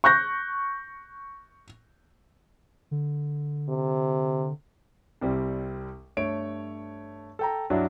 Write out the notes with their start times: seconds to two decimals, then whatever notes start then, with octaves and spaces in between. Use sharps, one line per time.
0.04 C#6 F#6 G6 A#6
2.91 D3
3.69 C3
5.21 C2 G3 C4
6.17 G2 A3 C#5 D7
7.39 A4 G5 A#5
7.70 G2 F#3 D4 E4 F#4 D5